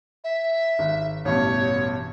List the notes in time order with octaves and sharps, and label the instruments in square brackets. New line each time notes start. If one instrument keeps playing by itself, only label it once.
[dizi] E5
[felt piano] G#1
[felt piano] A1 G2 B2 [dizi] C#5